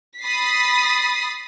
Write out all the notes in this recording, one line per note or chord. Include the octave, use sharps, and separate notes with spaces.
B5 D#6 A6 B6 C7